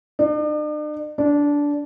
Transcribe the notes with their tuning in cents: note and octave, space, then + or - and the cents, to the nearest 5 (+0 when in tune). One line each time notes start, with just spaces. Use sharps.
D4 +45
D4 -15